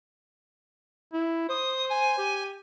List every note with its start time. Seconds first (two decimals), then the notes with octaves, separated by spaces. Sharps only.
1.13 E4
1.49 C5 D#6
1.89 G#5
2.18 G4